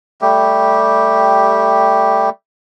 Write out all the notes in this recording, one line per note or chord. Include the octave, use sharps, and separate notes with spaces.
G3 A3 G4